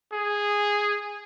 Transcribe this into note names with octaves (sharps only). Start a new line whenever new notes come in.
G#4